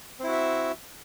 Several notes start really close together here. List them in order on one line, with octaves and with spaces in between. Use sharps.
C4 E4 F#4 E5